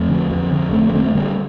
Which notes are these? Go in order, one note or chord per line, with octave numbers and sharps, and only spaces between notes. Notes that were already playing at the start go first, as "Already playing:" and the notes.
Already playing: F2 A3 C4
D3
F2
D3
F2 A3 C4
A#3
D3 A3 C4
A3
D3 G3 A#3